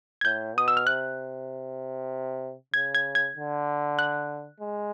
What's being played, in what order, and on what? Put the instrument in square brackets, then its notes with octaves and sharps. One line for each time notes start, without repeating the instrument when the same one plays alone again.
[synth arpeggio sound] G#6
[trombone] A2 [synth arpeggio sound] G6
[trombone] B2 [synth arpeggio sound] D#6
[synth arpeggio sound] E6
F6
[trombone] C3 [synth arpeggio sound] F#6
[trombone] C#3 [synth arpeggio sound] G#6
[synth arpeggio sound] G#6
G#6
[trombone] D3
[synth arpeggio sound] F#6
[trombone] G#3